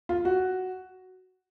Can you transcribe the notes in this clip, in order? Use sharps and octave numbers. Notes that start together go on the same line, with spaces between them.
F4
F#4